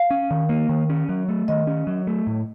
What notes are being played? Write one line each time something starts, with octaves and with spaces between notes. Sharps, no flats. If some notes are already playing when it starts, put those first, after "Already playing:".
Already playing: F5
C#4
D#3
A#3
D#3
C#4
F#3
A3
D#3 D#5
C#4
F#3
A3
A2